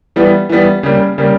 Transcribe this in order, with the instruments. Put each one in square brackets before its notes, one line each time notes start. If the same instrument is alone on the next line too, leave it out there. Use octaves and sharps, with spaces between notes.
[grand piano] E3 G3 B3
E3 G3 B3
C#3 G3 A#3
C#3 G3 A#3